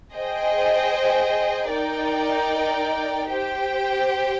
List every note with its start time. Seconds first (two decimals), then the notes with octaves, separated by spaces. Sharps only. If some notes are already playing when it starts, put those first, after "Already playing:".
0.13 G#4 C5 D#5 G5
1.72 D#4 A#4 D5 G5
3.31 G4 C5 G5